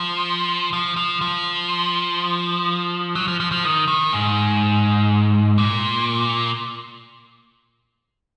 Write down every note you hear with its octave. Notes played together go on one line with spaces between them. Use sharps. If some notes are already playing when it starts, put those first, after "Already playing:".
Already playing: F3
F3
F3
F3
F#3
F3
F3
F3
D#3
D#3
G#2
A#2